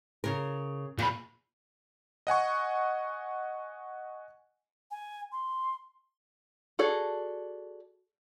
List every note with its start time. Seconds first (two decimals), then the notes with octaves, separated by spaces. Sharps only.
0.24 C#3 A#4
0.99 E2 A#2 B5
2.27 D#5 F#5 G#5 C#6
4.91 G#5
5.32 C6
6.79 F#4 G#4 A4 D5